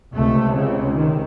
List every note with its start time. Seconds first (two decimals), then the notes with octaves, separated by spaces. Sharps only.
0.14 C#2 C3 A3
0.55 C#3
0.96 D#3